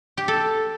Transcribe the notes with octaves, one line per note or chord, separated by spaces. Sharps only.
G4
A4